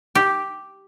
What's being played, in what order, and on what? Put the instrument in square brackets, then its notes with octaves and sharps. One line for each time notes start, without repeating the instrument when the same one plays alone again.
[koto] G4